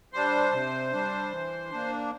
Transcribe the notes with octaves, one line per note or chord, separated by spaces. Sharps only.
G3 D4 C5
C3
G3 D4
E3
A#3 D4